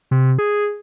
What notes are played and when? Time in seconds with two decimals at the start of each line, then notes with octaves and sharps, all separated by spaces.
0.11 C3
0.39 G#4